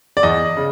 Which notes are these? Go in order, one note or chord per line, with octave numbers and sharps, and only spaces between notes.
D5
E2 D#5
C#3